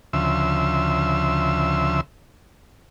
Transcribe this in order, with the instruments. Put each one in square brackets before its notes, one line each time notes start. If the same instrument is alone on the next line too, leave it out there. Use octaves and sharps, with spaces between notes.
[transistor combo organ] D2 C#3 F3 E5 C6 E6